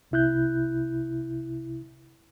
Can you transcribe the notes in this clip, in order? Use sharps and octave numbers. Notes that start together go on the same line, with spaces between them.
C2 C3 E4 F#6 G6